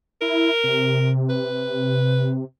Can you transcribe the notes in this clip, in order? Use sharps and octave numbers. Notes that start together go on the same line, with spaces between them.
E4 A#4
C3
B4